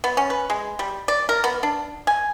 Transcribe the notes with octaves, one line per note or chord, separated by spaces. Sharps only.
B3
C#4
B4
G#3
G3
D5
A#4
B3
D4
G#5